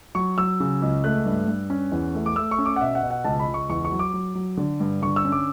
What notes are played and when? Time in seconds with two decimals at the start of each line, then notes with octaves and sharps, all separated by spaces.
0.15 F#3 C#6
0.38 F#3 E6
0.60 C#3
0.82 C#2
1.04 A3 F#6
1.26 G2
1.48 G2
1.70 C#4
1.92 E2
2.15 A3
2.26 D6
2.36 A3 E6
2.51 C#6
2.58 C#4
2.66 D6
2.76 F#5
2.81 B2 E5
2.95 F#5
3.03 B2
3.11 F#5
3.25 C#2 A5
3.40 B5
3.48 C#2
3.54 C#6
3.69 E2 C#6
3.85 C#6
3.92 F#3
3.99 D6
4.14 F#3
4.35 F#3
4.57 D3
4.80 G2
5.02 D3 C#6
5.16 E6
5.25 C#4
5.32 D6